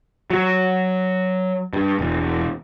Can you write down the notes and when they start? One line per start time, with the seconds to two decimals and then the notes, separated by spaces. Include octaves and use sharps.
0.30 F#3
1.73 G2
1.99 E1